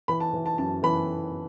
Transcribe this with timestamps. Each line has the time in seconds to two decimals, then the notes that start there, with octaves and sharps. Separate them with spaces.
0.08 E3 B5
0.20 A5
0.33 E3
0.46 A5
0.58 F#2 A5
0.83 E3 B5